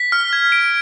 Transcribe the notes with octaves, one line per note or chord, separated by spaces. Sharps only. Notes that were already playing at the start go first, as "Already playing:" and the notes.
Already playing: B6
F6
G#6
D7